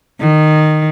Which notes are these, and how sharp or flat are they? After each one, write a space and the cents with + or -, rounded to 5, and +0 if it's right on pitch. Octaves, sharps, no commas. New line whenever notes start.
D#3 -15